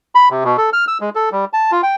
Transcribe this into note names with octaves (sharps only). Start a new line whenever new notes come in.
B5
C3
B2
A4
F6
E6
G#3
A4
G3
A5
F4
G5